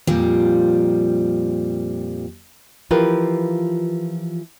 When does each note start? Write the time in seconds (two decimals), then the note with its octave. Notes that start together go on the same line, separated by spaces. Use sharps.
0.07 F2 A#2 F3 G3
2.91 E3 F3 F4 G4 A#4 B4